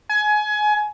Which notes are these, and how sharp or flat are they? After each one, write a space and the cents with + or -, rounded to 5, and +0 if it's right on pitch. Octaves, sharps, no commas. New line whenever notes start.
G#5 +25